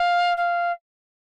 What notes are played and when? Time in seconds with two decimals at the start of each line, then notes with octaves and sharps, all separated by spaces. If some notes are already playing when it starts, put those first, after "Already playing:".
Already playing: F5
0.37 F5